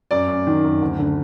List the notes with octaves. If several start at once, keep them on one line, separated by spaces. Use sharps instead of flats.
F#2 D5
F#2
D#3
F#2
D2
D3